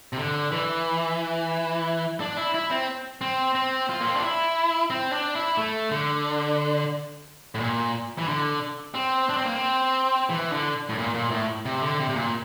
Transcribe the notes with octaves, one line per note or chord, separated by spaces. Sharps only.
C3
D3
E3
D4
E4
E4
C4
C4
C4
F4
A#3
C4
D4
E4
C4
D4
E4
A3
D3
A2
A#2
E3
D3
C4
D4
C4
A#3
C4
E3
D3
A2
A#2
A#2
A2
C3
D3
C3
C3
A#2